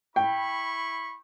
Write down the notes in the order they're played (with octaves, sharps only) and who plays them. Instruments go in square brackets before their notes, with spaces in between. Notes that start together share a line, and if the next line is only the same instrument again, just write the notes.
[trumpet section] E4 B5 C#6 [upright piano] G5